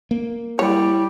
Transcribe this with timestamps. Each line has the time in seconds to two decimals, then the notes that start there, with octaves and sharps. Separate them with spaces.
0.11 A#3
0.59 G3 E4 C#5